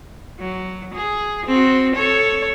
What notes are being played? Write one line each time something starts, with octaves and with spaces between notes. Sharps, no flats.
F#3
G#4
C4 F#4
A4 C#5